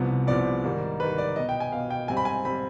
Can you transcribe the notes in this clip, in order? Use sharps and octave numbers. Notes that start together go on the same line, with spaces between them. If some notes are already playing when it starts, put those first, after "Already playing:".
Already playing: C2 C3 F3 B3 C5
C2 C3 F3 B3 D5
G#2 D#3 G3
G#2 D#3 G3 B4
D5
B2 B3 D#5
G5
G#5
B2 B3 F5
G5
G#2 G3 C4 G#5
B5
G#5
G3 C4 B5